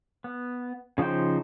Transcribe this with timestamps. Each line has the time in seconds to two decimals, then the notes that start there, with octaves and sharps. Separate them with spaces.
0.24 B3
0.98 C#3 F3 D#4 C5 G5